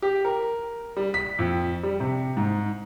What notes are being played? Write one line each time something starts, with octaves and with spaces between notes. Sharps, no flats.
G4
A#4
G3
B6
F2
G3
C3
G#2